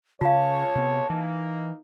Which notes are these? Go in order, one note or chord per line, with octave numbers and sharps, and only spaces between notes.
C#2 C#3 F4 C#5 F5 A5
C3 B3
E3 A#3 D#4